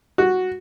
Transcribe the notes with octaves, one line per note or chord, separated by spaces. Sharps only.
F#4